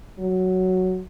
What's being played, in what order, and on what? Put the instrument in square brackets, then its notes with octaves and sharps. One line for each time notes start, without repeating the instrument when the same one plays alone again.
[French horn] F#3